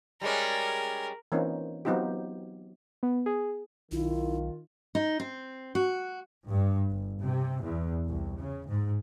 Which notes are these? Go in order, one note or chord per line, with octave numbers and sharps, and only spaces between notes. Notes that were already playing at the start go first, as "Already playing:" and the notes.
G3 G#3 C#4 A#4
E3 A#3 C4 C#4 D#4 F4
F#3 B3 C4 D#4 F4 G4
B3
G#4
B1 D#3 E4 F4
D#4
C4
F#4
G2
G1
C3
E2
C2
C#3
G#2